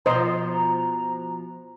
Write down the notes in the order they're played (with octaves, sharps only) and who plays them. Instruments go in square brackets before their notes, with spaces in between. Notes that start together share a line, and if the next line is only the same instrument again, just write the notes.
[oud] B2 F3 [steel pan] C5 D#5 C6 [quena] A#5